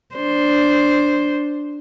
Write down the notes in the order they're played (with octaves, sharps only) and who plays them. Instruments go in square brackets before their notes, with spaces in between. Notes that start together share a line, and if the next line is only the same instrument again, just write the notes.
[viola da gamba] D4 C5